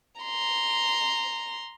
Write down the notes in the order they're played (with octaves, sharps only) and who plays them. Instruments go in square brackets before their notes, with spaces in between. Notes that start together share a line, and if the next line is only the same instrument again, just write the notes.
[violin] A#5 C6